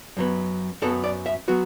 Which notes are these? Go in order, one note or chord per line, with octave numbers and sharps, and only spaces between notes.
F#2 F#3 B3
F#2 F#3 B3 A4
D5
E5
F#3 B3 F#4